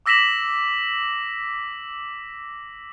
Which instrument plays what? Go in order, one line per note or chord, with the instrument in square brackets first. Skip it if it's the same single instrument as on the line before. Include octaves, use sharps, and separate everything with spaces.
[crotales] D6 E6 A#6 B6 E7 F#7